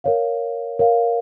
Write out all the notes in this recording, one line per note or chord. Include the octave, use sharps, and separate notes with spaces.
A#4 C#5 F5
A#4 C#5 F5